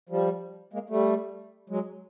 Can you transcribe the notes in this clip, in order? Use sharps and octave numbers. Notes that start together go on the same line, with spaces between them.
F3 G3
G#3 A#3
G3 A3
F#3 G#3